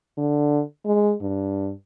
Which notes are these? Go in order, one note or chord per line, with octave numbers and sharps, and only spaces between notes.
D3
G#3
G2